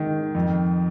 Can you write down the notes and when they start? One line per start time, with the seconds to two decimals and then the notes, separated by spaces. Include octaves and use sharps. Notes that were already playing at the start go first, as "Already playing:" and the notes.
Already playing: G#2 D#3
0.35 F2